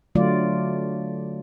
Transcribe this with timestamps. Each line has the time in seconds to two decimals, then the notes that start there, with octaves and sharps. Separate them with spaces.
0.15 D3 F#3 A3 F4 D5